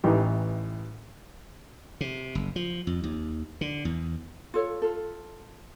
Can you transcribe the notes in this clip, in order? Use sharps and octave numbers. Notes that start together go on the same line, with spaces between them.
A1 E3 D#4 G4
C3
F#1
F3
F2
D#2
D3
E2
F4 A4 C#5
F4 A4